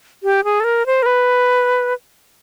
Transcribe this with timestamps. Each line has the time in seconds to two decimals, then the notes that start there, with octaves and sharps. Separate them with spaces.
0.23 G4
0.44 G#4
0.60 A4
0.64 A#4
0.86 C5
1.03 A#4
1.06 B4